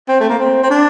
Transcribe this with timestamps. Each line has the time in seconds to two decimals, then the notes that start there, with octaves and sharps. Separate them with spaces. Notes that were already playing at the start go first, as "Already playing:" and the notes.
0.09 C4
0.20 A3
0.30 A#3
0.39 C4
0.63 C4
0.70 D4